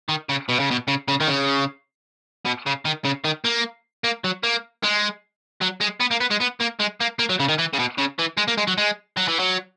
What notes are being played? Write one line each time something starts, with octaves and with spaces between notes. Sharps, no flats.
D#3
C#3
B2
C#3
B2
C#3
C#3
D#3
C#3
B2
C#3
D#3
C#3
D#3
A#3
A#3
F#3
A#3
G#3
F#3
G#3
B3
A#3
B3
G#3
B3
A#3
G#3
A#3
A#3
F#3
C#3
D#3
E3
C#3
B2
C#3
E3
G#3
A#3
G#3
F#3
G#3
F#3
E3
F#3